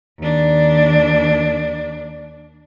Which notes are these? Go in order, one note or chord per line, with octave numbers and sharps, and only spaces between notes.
D#2 D4